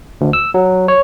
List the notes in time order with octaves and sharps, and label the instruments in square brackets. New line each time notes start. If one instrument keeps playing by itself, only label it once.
[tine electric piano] D2
E6
F#3
C#5